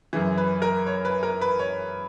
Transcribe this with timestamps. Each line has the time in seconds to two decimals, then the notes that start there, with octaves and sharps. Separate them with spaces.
0.13 F#2 C#3 E3
0.37 B4
0.62 A#4
0.86 C#5
1.05 B4
1.23 A#4
1.41 B4
1.59 C#5